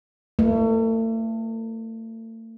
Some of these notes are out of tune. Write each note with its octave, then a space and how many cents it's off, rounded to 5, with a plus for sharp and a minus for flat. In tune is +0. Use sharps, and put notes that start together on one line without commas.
A3 +40 B4 -15 D#5 +0